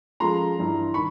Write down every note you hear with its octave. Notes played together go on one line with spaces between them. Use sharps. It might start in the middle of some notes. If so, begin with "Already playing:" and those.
F3 G#3 C#4 F4 A4 A#5 C6
G2 E3 G3
D#3 B5 C#6